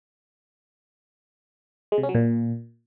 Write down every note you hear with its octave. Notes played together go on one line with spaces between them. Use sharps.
G#3
C3
C#4
F#3
A#2